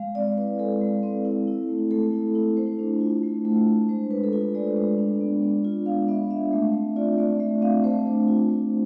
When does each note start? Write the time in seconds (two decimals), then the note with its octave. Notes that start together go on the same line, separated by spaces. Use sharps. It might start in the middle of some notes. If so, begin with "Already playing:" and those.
Already playing: G#3 F5
0.15 C4 D5
0.38 E4 B4
0.59 G#3 A4
0.81 G#3
1.03 C4
1.25 E4
1.47 E4
1.69 A3
1.91 A3 A4
2.13 E4
2.35 E4
2.57 A3 C5
2.79 D4
3.01 F4
3.23 A3
3.45 A3
3.67 D4
3.89 G#3 C5
4.11 D4 B4
4.24 A4
4.33 F4 B4
4.55 G#3 D5
4.76 G#3
4.98 D4
5.21 B3
5.42 D4
5.64 F4
5.86 B3 F5
6.08 B3 E5
6.30 D4 E5
6.53 A3 E5
6.74 C4
6.96 F4 D5
7.18 A3 D5
7.40 A3 E5
7.62 C4 F5
7.84 A3 C5
8.06 D4
8.28 F4
8.50 A3